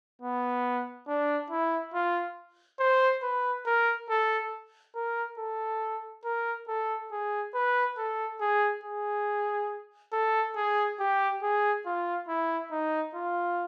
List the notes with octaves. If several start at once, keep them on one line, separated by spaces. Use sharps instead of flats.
B3
D4
E4
F4
C5
B4
A#4
A4
A#4
A4
A#4
A4
G#4
B4
A4
G#4
G#4
A4
G#4
G4
G#4
F4
E4
D#4
F4